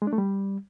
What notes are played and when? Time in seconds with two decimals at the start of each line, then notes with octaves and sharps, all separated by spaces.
0.02 G#3
0.07 D4
0.13 A3
0.18 G3